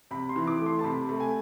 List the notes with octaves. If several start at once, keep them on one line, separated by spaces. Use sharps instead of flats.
C3 B5
C6
E3
D6
A3
C6
A5
C3 B5
A3
G#5